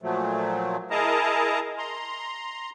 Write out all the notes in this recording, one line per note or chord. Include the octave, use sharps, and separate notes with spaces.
A#2 F3 F#3 A3
E4 G#4 A#4 D#5 A5 A#5
A#5 C6